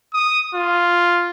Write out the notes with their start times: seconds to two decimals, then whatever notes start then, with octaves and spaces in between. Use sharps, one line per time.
0.13 D#6
0.54 F4